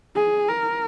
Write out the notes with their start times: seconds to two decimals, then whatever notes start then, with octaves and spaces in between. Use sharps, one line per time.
0.15 G#4
0.48 A#4